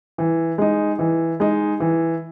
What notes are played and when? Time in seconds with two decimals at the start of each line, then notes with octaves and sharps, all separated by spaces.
0.18 E3
0.58 G#3 D#4
0.99 E3
1.40 G#3 D#4
1.80 E3